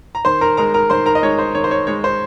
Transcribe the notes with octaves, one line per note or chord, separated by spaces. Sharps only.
A#5
D#3 C5 C6
A#4 A#5
G#3 D#4 A#4 A#5
A#4 A#5
D#3 C5 C6
A#4 A#5
D#5
G#3 D#4 C#5
C5
D#3 C#5
C5
C#5
G#3 D#4 C#5
C5